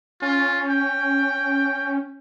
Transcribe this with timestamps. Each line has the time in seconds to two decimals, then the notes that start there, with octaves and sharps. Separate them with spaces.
0.22 C#4 F4
0.68 G5